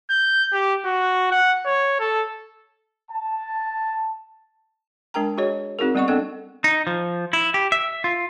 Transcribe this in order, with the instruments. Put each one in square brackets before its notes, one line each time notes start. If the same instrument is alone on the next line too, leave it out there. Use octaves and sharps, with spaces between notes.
[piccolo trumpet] G6
G4
F#4
F#5
C#5
A4
[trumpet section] A5
[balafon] G#3 D4 A#4 G5 A#5
F#4 G#4 C#5 D#5
C4 D#4 F#4 G#4 A#4
G3 B3 C4 D#5 F#5 C#6
B3 C4 D4 A4 D#5 G5
[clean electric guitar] D#4
F3
E4
G4
E5
F4